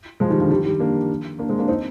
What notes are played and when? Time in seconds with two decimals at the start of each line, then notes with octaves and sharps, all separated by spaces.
0.20 F3 G#3
0.30 D#3 G3
0.40 D3 F3
0.50 D#3 G3
0.65 D#3 G3
0.80 A#3 D4
1.39 A#3 D4
1.48 G#3 C4
1.59 A#3 D4
1.68 C4 D#4